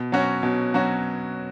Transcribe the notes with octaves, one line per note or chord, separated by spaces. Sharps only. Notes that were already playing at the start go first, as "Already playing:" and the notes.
Already playing: B2
F#3 C#4 F#4
B2
F#3 C#4 F#4